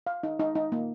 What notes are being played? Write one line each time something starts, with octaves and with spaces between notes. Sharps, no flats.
F5
D#4
D#4
D#4
A#3